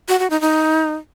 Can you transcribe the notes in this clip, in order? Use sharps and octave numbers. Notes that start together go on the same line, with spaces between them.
F#4
F#4
D#4
D#4